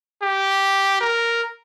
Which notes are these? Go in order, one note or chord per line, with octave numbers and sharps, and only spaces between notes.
G4
A#4